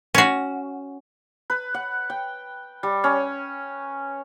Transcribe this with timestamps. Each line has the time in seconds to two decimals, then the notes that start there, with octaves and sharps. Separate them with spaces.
0.15 C#4 F#4
1.50 B4
1.74 F#5
2.10 G5
2.83 G3
3.04 C#4